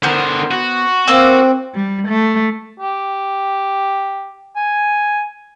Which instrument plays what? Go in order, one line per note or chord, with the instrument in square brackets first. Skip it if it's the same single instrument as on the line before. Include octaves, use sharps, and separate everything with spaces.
[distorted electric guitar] D3 A#4 [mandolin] B3 C5
[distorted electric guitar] F#4
[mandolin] A#3 D6 E6 [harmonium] C4
[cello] G3
A3
[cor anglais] G4
G#5